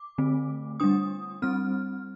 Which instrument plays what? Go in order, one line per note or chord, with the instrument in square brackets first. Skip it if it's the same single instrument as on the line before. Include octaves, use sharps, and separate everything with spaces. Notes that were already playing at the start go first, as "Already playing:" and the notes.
Already playing: [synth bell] D6
D3 A3 C4
G3 D4 D#6
G3 C4 F6